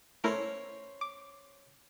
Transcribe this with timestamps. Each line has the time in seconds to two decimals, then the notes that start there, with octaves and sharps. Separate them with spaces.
0.24 A3 C#4 E4 A#4 C5 C#5
1.01 D6